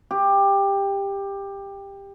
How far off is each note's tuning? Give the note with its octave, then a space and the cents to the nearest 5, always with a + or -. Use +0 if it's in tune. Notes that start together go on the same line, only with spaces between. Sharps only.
G4 +15